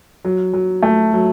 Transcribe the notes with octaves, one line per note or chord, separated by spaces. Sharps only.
F#3
F#3
A3
F#3